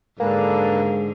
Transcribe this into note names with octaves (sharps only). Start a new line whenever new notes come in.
G#2 D3 G#3 A#3 D4 G#4 A4 B4